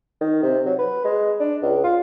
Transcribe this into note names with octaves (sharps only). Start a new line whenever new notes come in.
D#3
C3
F#3
B4
G#3
D4
C#2
F4